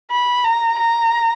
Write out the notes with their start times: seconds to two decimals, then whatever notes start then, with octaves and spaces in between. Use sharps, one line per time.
0.11 B5
0.45 A#5
0.79 A#5